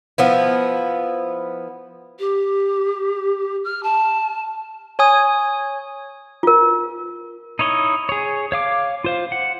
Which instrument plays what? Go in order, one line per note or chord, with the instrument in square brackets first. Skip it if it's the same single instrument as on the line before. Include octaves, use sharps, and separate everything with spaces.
[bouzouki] F3 B3 E4
[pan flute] G4
F6
A5
[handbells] C#5 G#5 D#6
[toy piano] F4 A#4
[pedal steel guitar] D#4 E4 C#5 D#5
G#4 C#5
C#5 F5 D6
F4 C5 F5
F#5